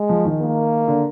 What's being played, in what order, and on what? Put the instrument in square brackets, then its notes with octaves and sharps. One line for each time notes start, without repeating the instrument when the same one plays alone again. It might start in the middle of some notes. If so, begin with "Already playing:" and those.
Already playing: [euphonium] G#3
[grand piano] F3
D#3
[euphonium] A#3
[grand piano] D3